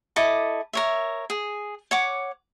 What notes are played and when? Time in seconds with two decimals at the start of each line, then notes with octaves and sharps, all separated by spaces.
0.16 E4 A4 D#5 D6
0.73 A#4 C#5 E5
1.30 G#4
1.91 C#5 F#5 D6